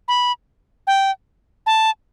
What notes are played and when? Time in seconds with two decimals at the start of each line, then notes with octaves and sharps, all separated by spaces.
0.08 B5
0.87 G5
1.66 A5